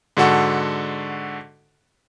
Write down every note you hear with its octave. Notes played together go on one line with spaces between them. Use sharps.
G#2 D3 F#4 A4 F#5 C#6